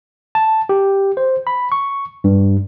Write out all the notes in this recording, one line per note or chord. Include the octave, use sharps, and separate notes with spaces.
A5
G4
C5
B5
C#6
G2